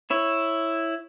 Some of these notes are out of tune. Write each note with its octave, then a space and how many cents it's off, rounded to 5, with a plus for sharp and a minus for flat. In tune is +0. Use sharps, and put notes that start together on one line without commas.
E4 +0 C#5 -10